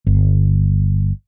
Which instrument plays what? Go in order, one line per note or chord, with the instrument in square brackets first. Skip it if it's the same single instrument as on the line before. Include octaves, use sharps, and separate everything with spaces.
[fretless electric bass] G1